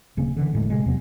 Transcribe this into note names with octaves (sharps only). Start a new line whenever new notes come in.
D1 C#3 A#3 C#4
D3 E3
E1 A2 G#3 A3
C3 G#3
E2 C3 F#3 B3